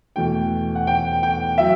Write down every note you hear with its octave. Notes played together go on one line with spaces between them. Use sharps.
E2 B2 A3 G5
F#5
G5
G5
F#3 E5